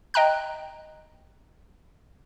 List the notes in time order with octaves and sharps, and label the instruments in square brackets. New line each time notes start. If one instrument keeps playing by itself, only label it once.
[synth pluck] D#5 G5 A#5 F#6